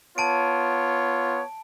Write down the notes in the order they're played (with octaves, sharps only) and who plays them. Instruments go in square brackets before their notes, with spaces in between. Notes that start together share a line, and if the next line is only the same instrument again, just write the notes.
[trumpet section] B3 F4 C#5 [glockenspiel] A5 D7